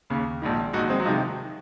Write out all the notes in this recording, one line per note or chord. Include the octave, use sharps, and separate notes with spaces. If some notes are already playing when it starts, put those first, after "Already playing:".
D#2 C#3
A#1 G#2 D#3
A#1 G#2 D#3 D#4 F#4
G#3 C4
F#3
C3 D#3 F3 G#3